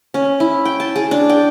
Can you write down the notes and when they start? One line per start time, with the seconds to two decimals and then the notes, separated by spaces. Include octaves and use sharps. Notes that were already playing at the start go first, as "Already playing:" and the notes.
0.14 C#4
0.40 E4
0.65 G5
0.80 A5
0.96 G#4
1.11 D4
1.30 G5